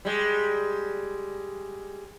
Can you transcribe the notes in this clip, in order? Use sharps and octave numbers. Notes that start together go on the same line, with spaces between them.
G3 G#3